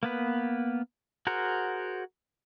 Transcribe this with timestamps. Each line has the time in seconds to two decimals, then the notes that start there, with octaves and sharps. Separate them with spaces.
0.03 A#3 B3 B4
1.27 F#4 G#4 A#4 C5 F#5